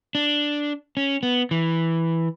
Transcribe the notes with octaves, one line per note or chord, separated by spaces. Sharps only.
D4
C#4
B3
E3